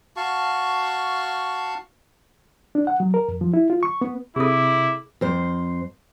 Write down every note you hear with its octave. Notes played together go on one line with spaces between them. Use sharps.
F#4 F5 A5 C#6
D4
F#5
F#3
A#4
F2
F3
E4
F4
C#6
B3
C3 E4 G#4 A4 D6
F2 C5